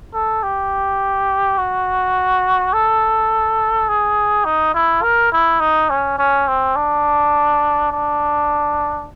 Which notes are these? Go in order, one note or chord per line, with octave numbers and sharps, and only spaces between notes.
A4
G4
F#4
A4
G#4
D#4
E4
A#4
E4
D#4
C#4
C#4
C4
D4
D4